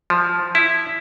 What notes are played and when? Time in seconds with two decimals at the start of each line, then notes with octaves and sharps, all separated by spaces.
0.10 F3
0.55 E4